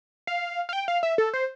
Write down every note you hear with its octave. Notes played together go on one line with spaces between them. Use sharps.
F5
F5
G5
F5
E5
A4
C5